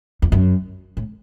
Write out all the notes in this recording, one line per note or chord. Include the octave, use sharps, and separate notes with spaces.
E2
F#2
A2